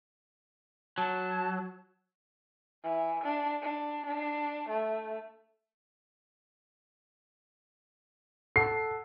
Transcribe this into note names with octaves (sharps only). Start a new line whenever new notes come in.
F#3 A5
E3
D4
D4
D4
A3
A4 F#5 A5 C7